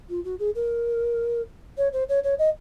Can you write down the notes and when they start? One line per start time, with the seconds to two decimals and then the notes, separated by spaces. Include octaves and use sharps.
0.09 F4
0.24 F#4
0.39 G#4
0.55 A#4
1.77 C#5
1.93 C5
2.09 C#5
2.23 C#5
2.39 D#5